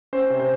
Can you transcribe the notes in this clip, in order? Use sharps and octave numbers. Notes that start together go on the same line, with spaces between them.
C#4 C5
C3
C5